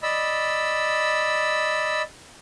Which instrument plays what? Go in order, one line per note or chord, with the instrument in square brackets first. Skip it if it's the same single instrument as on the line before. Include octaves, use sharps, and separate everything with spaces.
[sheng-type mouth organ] D5 D#5 B5 E6